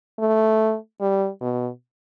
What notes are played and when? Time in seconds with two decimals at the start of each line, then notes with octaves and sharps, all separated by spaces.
0.19 A3
1.01 G3
1.41 B2